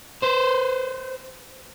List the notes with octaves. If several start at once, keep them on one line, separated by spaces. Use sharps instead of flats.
B4 C5